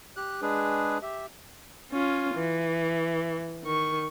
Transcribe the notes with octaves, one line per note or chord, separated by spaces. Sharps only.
G4 F#6
G#3 D4 G#4 B4
G4 E5
C#4 F4
E3
D#3 C#6